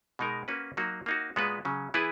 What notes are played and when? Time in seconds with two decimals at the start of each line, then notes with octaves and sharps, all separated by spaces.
0.19 B2 G#3 D#4 A#4
0.48 A#3 C#4 F#4 B4
0.77 F#3 A#3 D#4 F#4
1.06 A#3 D#4 F#4
1.36 A#2 G#3 B3 F#4 B4
1.65 C#3 F#3 C#4
1.94 E3 B3 E4 G#4 B4